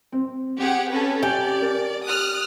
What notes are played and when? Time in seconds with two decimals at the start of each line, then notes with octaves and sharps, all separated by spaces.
0.12 C4
0.58 C4 G4 G#4 F#5
0.90 C#4 A4 B4
1.23 G4 D5 G#5
1.62 A#4
2.05 D#6 F6 F#6